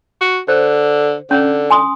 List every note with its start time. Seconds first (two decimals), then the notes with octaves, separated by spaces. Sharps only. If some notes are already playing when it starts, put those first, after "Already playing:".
0.21 F#4
0.48 D3 C5
1.31 D3 C#4
1.70 G#5 C6 D#6